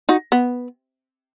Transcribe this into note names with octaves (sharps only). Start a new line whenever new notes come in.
D#4 F#4
B3